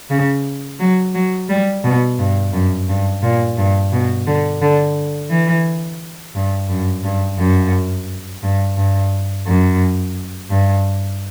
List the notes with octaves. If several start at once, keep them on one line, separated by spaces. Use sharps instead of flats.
C#3
F#3
F#3
G3
B2
G2
F#2
G2
A#2
G2
B2
D3
D3
E3
G2
F#2
G2
F#2
G2
G2
F#2
G2